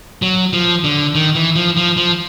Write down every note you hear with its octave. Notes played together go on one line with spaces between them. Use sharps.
F#3
F3
D3
D#3
E3
F3
F3
F3